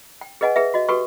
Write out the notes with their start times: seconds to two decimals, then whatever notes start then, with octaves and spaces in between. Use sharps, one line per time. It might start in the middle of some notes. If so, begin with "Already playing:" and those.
0.21 G5
0.41 G#4 B4 D#5 F#5 G#5
0.56 G#4 B4 E5
0.74 F#4 D#5
0.88 F#4 G4 A4 B4 G5 C#6